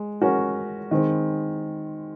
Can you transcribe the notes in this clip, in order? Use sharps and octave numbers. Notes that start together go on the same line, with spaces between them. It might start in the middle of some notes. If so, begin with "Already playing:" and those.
Already playing: G#3
G#3 C#4 F#4 A#4
D#3 G#3 C4